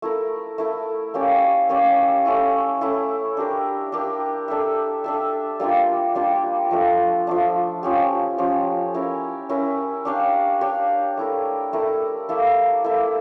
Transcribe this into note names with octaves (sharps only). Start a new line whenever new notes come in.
A3 E4 A#4
A3 E4 A#4
A#3 C#4 G4 D5
A#3 C#4 G4 D5
A3 C#4 E4
A3 C#4 E4
D4 G4 A#4
D4 G4 A#4
D4 A4 E5
D4 A4 E5
G3 A#3 D4 F4
G3 A#3 D4 F4
F3 A3 D4
F3 A3 D4
F3 C#4 G4
F3 C#4 G4
C#4 E4 A#4
C#4 E4 A#4
D4 G4 C#5 F5
D4 G4 C#5 F5
A3 E4 A#4
A3 E4 A#4
A#3 E4 A4 E5
A#3 E4 A4 E5